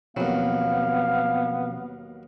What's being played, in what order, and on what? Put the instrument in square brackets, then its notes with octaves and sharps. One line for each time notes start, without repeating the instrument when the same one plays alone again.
[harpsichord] D#2 F#3 [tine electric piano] B2 F3 C4 [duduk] B3 [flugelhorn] F5